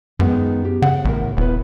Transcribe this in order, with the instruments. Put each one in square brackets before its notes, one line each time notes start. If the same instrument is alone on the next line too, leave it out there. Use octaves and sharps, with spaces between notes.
[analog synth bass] F#2 [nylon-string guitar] D#3 G#3 B3
[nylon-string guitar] G4
[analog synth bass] C#3 [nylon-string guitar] F#5
[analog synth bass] A1 [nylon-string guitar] A2 A#4
[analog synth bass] D#1 [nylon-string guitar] B3 E4 B4